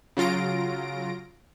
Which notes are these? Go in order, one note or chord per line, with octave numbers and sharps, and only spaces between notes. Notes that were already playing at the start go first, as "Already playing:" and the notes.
C#3 F#3 F4 A#6 D7